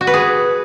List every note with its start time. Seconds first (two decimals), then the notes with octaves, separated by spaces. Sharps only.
0.01 F#4
0.07 B4
0.14 G#4